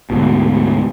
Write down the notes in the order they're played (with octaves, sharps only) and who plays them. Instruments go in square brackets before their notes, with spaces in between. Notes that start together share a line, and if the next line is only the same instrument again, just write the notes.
[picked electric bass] D2 G#2 B2